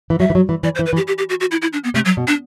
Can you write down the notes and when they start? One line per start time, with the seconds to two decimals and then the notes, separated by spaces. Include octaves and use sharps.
0.10 E3
0.20 F#3 E5
0.30 E3
0.35 F#3
0.49 E3
0.63 E3 D5
0.75 C5
0.79 E3
0.86 B4
0.93 E3
0.97 G4
1.08 G4
1.18 G4
1.29 F#4
1.40 F#4
1.51 E4
1.62 E4
1.73 D4
1.84 B3
1.94 C3 A3
2.05 F#3
2.17 B2
2.27 D4